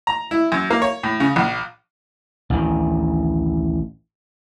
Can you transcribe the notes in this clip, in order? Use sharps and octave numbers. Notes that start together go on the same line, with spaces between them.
A#5
E4
F#2
A#3
C#5
A2
C#3
A#1
A1 D2 D#3